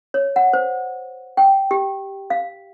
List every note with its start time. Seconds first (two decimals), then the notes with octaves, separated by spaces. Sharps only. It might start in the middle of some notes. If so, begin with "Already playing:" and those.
0.14 C#5
0.36 F#5
0.53 C5
1.37 G5
1.71 G4
2.30 F5